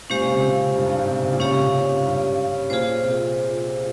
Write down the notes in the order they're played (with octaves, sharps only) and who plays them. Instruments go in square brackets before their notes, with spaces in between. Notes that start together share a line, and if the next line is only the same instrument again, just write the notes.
[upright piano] A#2 [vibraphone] G#3 C#4 G4 C5 F5
[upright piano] A#2
C#3
C3
C3
G2
G2
G#2
C3
C#3
C3
A#2
[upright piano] C#3 [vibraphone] C#4 G4 C#5 F5
[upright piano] C3
A#2
G#2
G2
[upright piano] A#2 [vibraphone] F4 G#4 C5
[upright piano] C3